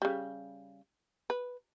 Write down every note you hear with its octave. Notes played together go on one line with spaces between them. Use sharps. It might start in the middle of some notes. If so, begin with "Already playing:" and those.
C#3 G3
B4